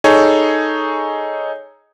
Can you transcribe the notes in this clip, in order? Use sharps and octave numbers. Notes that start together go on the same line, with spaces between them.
D#4 G#4 A4 C#5